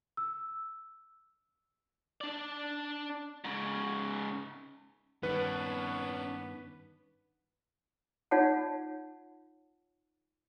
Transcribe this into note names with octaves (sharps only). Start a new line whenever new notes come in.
E6
D4 D5
G#2 C#3
G2 D#3 B3 C#4 D4 B4
D#4 F4 C#5 F#5 A5